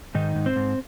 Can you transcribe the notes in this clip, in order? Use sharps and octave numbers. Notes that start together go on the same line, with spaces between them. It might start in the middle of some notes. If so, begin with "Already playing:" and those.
G#2 D#3 D#4
G#2
C4 C5
G#2